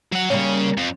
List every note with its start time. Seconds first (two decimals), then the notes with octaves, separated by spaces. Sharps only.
0.12 F#3 F#5
0.30 C#3 G3 A#3 C#4 C#5
0.78 F2